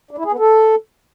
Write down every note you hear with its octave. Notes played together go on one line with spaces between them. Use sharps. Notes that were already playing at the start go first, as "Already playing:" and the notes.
D4
E4
G#4
B3
A4